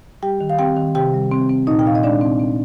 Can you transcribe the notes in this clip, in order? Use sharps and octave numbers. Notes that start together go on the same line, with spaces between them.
G3 G4 G5
D#3
F5
C4 G4 G5
D#3
C3 G4 G5
G3
C4
C4
A#2 D#4 D#5
G5
A#2 F5
D#5
G#3 D4 D5
C4
C4